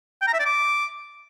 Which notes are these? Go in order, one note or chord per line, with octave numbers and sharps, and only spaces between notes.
G5
A#5
E5
D5
D6